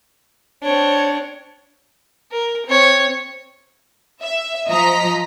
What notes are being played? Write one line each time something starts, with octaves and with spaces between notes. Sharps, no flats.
C4 D4 C#5
A#4
C4 C#5
E5
F3 D#5 A#5 B6